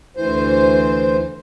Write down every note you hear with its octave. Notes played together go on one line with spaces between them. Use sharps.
D2 E3 C5